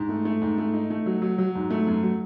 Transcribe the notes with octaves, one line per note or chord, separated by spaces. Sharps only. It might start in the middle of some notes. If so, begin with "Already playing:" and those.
Already playing: G#2
A3
A3
G#2
A3
D#4
A3
F#3
F#3
F#3
G#2
A3
F#2
F#3